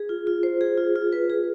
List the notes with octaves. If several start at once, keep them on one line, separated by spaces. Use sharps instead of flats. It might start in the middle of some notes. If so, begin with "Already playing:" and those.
Already playing: G#4
F4
F4
C5
G#4
F4
F4
B4
G#4